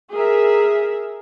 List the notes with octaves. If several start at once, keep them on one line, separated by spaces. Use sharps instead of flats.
G#4 A#4 E5